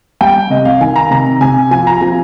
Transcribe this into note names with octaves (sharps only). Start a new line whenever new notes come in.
G3 G5
C3 D#5
F5
D#3 G#5
A#5
C3 A#5
C3 G#5
F3 G#5
A#5
F3 G#5